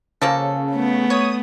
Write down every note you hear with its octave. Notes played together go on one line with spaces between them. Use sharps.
C#3 F3 A#3 A4
A3 B3
C#5 D#6